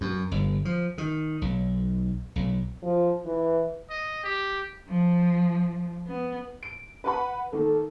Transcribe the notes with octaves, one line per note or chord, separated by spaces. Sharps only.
F#2
G1
F3
D#3
B1
B1
F3
E3
D#5
G4
F3
B3
D7
B4 F#5 B5
D#3 A#3 A4